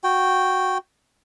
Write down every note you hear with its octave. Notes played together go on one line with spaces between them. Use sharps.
F#4 G5